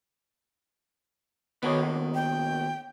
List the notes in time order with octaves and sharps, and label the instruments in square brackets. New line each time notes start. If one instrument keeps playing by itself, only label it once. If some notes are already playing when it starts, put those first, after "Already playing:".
[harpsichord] D#3 [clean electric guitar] B3 F#4 C#5
[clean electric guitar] D#2 B2
[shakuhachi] G5